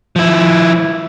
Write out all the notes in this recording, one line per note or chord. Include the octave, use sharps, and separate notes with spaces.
F3 E4